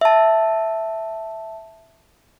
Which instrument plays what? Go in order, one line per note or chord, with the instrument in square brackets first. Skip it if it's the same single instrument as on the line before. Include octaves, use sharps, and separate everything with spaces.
[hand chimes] E5 A5